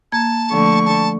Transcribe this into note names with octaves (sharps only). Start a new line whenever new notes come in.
A#3 A5 G#6
D3 F3 A3 C#6
A5